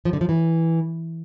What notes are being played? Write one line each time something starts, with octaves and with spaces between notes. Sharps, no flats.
F3
D3
F3
E3